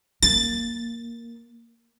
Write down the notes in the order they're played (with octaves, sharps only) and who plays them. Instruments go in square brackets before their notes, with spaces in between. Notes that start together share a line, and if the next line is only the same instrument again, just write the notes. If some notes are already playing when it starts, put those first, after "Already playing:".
[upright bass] A#3 [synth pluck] A6